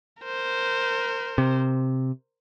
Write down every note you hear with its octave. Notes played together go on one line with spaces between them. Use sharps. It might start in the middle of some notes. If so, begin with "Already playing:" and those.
A#4 C5
C3